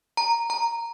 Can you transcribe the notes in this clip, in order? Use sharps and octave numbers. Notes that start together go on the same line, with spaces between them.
A#5
A#5